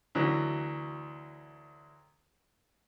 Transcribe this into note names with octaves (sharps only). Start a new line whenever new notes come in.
D2 E3 F#3